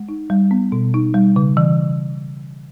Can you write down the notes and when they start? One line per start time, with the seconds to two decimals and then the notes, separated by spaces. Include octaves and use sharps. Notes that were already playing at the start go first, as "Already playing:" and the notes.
Already playing: G#3
0.09 D#4
0.30 G3
0.51 B3
0.72 B2
0.94 D#4
1.14 G3
1.36 C#3
1.57 E3